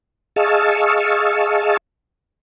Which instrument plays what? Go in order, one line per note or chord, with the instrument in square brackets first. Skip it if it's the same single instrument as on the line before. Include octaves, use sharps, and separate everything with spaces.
[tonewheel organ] G#4 D#5 F5 A5 C#6 E6